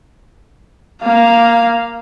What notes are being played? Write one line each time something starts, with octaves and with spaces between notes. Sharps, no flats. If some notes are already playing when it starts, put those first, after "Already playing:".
A#3 F5